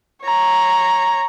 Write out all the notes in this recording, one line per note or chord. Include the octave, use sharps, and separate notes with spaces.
C#5 A#5